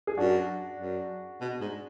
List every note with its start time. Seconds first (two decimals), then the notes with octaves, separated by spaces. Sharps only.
0.07 G#4
0.17 F#2 D4 F#4
0.79 F#2
1.41 B2
1.61 G#2